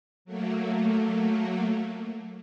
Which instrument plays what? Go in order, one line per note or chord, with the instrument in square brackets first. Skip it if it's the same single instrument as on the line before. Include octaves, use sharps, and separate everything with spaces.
[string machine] F#3 A3 A#3